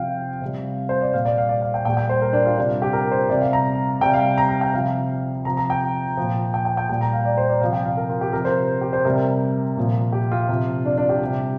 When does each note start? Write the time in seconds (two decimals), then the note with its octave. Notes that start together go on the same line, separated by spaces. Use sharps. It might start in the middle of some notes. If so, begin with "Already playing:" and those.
Already playing: C3 F3 F5 G5
0.41 C3 G3
0.89 C5
1.02 D5
1.14 A#2 G3 F5
1.25 D5
1.38 F5
1.49 D5
1.62 F5
1.74 G5
1.85 A#2 G3 G5
1.97 G5
2.09 C5
2.22 A#4
2.33 D4
2.46 F4
2.57 C3 G3 D4
2.69 F4
2.82 G4
2.93 A#4
3.12 C5
3.30 C3 G3 D5
3.41 F5
3.53 A#5
4.01 C3 G3 G5
4.14 F5
4.38 A#5
4.49 A#5
4.61 G5
4.73 C3 F3 F5
5.45 C3 F3 A#5
5.57 A#5
5.70 G5
6.17 A#2 F3
6.54 G5
6.65 G5
6.77 G5
6.89 A#2 G3 G5
7.01 A#5
7.13 F5
7.25 D5
7.37 C5
7.50 D5
7.61 C3 F3 F5
7.73 G5
7.85 F5
7.97 A#4
8.09 F4
8.21 G4
8.33 C3 F3 A#4
8.45 C5
8.81 G4
8.93 C5
9.05 C3 G3 A#4
9.77 A#2 F3
10.12 G4
10.31 F4
10.48 C3 F3
10.85 D4
10.98 D4
11.09 G4
11.21 C3 G3